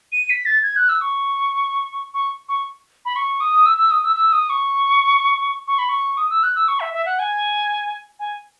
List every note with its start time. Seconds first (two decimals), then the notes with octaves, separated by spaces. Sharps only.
0.12 D#7
0.30 B6
0.46 A6
0.63 G#6
0.76 F#6
0.89 E6
1.01 C#6
2.14 C#6
2.49 C#6
3.05 B5
3.16 C#6
3.40 D#6
3.66 E6
3.78 E6
3.91 D#6
4.04 E6
4.16 E6
4.32 D#6
4.50 C#6
5.68 C#6
5.79 B5
5.89 C#6
6.17 D#6
6.30 E6
6.43 F#6
6.56 E6
6.68 C#6
6.80 E5
6.94 E5
7.05 F#5
7.19 G#5
8.19 G#5